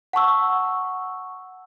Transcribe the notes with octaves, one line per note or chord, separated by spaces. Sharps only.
F#5 A5 C#6 E6